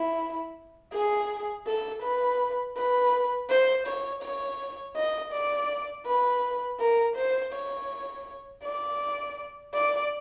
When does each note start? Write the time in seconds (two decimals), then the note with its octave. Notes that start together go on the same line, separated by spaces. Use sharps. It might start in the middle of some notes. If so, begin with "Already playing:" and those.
Already playing: E4
0.93 G#4
1.66 A4
2.02 B4
2.76 B4
3.49 C5
3.87 C#5
4.23 C#5
4.96 D#5
5.33 D5
6.06 B4
6.80 A#4
7.16 C5
7.53 C#5
8.63 D5
9.74 D5